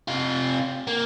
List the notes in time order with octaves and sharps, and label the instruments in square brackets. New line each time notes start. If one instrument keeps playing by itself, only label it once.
[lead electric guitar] C3 F4
A#3